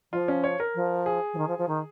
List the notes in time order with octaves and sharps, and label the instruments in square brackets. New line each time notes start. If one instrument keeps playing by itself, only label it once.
[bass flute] F3 [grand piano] F4
[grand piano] C#4
C#5
A#4
[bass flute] F3
[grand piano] G#4
[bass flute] F3
D#3
F3
F3
D#3